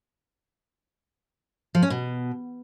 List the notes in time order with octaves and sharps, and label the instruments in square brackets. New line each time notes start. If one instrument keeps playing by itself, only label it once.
[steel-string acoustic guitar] F3
C#4
B2